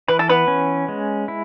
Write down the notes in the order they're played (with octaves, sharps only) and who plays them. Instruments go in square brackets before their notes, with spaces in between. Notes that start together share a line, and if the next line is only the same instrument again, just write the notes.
[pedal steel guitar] E3 [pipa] B4
[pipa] A4
B3 B4
[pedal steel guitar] C#4
G#3
E4